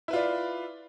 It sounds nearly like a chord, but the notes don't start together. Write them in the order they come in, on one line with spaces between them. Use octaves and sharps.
E4 B4 F4 D5